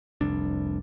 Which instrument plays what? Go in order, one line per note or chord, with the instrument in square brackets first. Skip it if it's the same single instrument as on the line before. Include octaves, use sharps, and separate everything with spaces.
[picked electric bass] F1 C2 D4